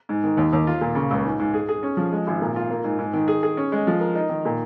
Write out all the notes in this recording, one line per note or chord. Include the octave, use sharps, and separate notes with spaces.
G#2
D#3
D#2
D#2
F4
A#2
C#3
C#2
G#2
G#2
G#4
G#4
C#4
F3
G#3
G#1
A#2
F4
A#3
G#2
G#2
D#3
G#4
G#4
C#4
G#3
F3
A#4
D#4
D#3
A#2